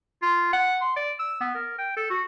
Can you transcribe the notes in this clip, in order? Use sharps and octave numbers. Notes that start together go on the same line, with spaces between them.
F4
F#5
C6
D5
E6
B3
A#4
G5
A4
F#4